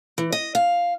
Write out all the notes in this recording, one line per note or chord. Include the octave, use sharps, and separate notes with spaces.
E3
D#5
F5